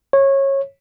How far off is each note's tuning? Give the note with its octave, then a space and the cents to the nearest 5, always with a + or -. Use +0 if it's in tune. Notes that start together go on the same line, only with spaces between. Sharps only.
C#5 -20